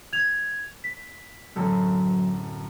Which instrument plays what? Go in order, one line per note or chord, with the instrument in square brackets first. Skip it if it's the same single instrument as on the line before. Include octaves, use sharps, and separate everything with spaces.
[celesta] G#6 F7
B6
[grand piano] D1 F#2 A4 [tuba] F#3